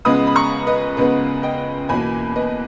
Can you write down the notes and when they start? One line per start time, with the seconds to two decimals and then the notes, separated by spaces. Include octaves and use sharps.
0.05 C#2 C#3 G#3 B3 B5 D#6
0.27 B5
0.35 A#5 C#6
0.67 B4 D#5
0.97 C#2 C#3 G#3 B3 B4
1.43 D#5 G5
1.89 E2 B2 A#3 G#5 B5
2.36 B4 D#5